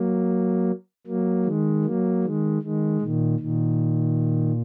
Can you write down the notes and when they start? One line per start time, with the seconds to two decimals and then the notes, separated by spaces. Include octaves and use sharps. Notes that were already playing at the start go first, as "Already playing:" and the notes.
Already playing: F#3 A#3
1.07 F#3 A#3
1.45 D#3 G#3
1.85 F#3 A#3
2.24 D#3 G#3
2.62 D#3 G#3
3.01 A#2 D#3
3.39 A#2 D#3